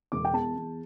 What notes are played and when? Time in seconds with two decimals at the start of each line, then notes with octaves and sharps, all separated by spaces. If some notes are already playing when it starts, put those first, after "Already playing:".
0.12 E1 D6
0.25 G5
0.33 E2 A5
0.56 E2